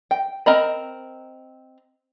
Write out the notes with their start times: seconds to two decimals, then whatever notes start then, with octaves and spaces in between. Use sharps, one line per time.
0.11 G5
0.46 C4 A#4 D#5 A#5 B5